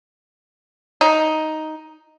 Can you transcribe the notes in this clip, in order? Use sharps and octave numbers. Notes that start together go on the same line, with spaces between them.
D#4